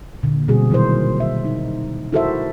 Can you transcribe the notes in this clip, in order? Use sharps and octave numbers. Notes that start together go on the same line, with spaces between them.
A#2 D3
B2 G3 C4 F#4 G#4
A#2 D#3 F#3 E4 A#4 C5
E5
D#4
E4 F#4 A4 A#4 C5 E5